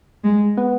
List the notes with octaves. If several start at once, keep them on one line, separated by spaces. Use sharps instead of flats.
G#3
B3